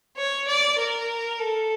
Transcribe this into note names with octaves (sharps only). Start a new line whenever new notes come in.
C#5
D5
A#4
A4